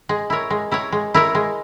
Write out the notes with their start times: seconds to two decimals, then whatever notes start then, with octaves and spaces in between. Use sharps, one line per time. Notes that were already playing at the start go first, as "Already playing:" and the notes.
0.09 G#3
0.30 E4 A#4 C#5
0.50 G#3
0.71 E4 A#4 C#5
0.92 G#3
1.14 E4 A#4 C#5
1.35 G#3